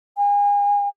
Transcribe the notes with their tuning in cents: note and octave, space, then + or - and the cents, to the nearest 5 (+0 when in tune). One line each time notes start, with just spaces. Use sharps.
G#5 -35